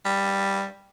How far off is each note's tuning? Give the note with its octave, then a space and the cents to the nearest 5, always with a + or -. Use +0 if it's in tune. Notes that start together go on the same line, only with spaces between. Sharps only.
G3 +5